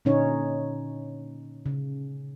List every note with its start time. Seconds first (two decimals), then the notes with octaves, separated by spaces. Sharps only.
0.05 A#2 D3 C#4 D#4 C#5
1.66 C#3